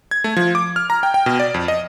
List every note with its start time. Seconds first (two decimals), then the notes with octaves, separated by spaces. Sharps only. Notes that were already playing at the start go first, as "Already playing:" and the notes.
0.11 G#6
0.24 A3
0.37 F3
0.55 D6
0.76 F6
0.90 A#5
1.03 G5
1.14 G5
1.26 B2
1.40 D5
1.54 F2
1.68 D#5